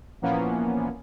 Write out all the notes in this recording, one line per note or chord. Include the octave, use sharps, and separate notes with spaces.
A#2 E3 F3 A#3 B3 C#4